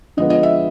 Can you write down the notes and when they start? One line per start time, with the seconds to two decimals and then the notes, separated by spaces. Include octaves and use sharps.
0.17 D3 F3 G#3 B3 D#5
0.30 D#5
0.43 E5